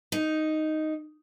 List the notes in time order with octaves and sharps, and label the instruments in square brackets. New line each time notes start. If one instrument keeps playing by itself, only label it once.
[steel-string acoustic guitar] D#4